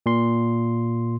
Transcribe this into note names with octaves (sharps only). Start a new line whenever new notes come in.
A#2 C6